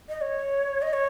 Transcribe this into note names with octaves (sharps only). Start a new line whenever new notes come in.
D#5
C#5
D#5
C#5